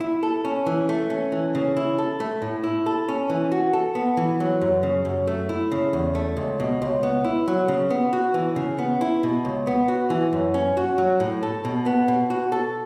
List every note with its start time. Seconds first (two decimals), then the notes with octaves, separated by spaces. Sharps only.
0.01 E4
0.23 A4
0.45 C#4
0.66 E3
0.89 A3
1.10 C#4
1.32 E3
1.55 C#3
1.77 E4
1.98 A4
2.20 A3
2.42 A2
2.64 E4
2.86 A4
3.08 C#4
3.30 E3
3.52 F#4
3.73 A4
3.95 B3
4.17 E3
4.40 F#3
4.61 F#2
4.83 C#3
5.05 F#2
5.27 A3
5.49 E4
5.72 C#3
5.93 E2
6.15 A3
6.37 C#2
6.60 B2
6.82 C#2
7.03 B3
7.25 E4
7.48 F#3
7.68 C#3
7.90 B3
8.13 F#4
8.34 E3
8.56 C#3
8.78 B3
9.01 E4
9.23 B2
9.45 C#2
9.67 B3
9.88 F#4
10.10 E3
10.33 F#2
10.54 C#4
10.77 F#4
10.98 F#3
11.20 A2
11.43 A4
11.65 B2
11.86 B3
12.08 B2
12.30 F#4
12.52 A4